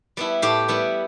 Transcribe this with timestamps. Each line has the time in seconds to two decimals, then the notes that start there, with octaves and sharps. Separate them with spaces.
0.17 G3 B3 E4
0.42 A2 G4
0.68 G3 B3 E4